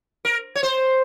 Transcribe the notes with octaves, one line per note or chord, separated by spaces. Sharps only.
A#4
C#5
C5